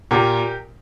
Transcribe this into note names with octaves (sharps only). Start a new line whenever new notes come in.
A#2 G4 A#4